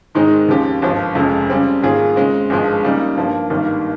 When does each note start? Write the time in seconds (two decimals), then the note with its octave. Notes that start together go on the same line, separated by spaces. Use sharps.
0.15 G#2 D#3 G#3 C4 D#4
0.48 D#2 C#3 F3 C4 G4
0.82 G#1 G2 F3
1.15 F1 F2 C#3 G#3
1.50 C#3 G3 C4
1.83 G#2 D#3 A#3 F4 G#4
2.16 C#3 G#3 C4
2.50 G#1 G2 F3 G#3
2.83 C#3 G3 A#3 D#4
3.17 G2 F3 A#3
3.50 G#1 G2 D#3 G3 A#3